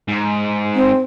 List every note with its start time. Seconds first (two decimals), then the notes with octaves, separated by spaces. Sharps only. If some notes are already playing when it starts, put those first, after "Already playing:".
0.08 G#2
0.75 C4